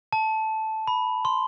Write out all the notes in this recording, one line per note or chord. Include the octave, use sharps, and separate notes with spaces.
A5
B5
C6